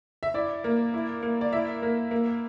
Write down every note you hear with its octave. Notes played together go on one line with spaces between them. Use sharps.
E5
E4 D5
A#3
E4
A#3
D5
E4 E5
A#3
A#3